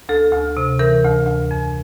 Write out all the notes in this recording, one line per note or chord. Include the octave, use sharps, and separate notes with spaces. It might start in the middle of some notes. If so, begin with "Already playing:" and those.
D2 A4
D2
C3
E3 A#4
D2
D2
F2